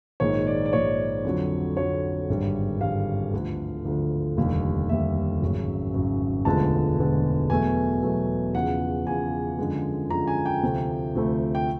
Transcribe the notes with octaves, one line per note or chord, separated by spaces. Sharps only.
A#1 G#2 D#3 C#5
D5
D5
A#1 G#2 D#3 C#5
F2 D3 F#3
F2 D3 F#3 C#5
G#1 G2 D3 G3
G#1 G2 D3 G3 F5
D2 D3 F3
D2 D3 F3
F1 D#2 D3 G3
F1 D#2 D3 G3 E5
G#1 F#2 C#3 F#3
G#1 F#2 C#3 F#3
E1 D2 D3 F3 G#3 A5
E1 D2 D3 F3 G#3
E2 B2 F#3 A3 G#5
E2 B2 F#3 A3
E2 C#3 F3 F#5
E2 C#3 F3 G#5
F#2 D3 F3 G#3
F#2 D3 F3 G#3 A#5
G#5
G5
D2 C3 F3 A3
D2 C3 F3 A3
G5